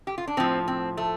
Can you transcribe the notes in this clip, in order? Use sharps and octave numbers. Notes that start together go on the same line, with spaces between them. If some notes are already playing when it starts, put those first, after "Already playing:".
G4
F4
D4
A2 F3 C4
C4
A3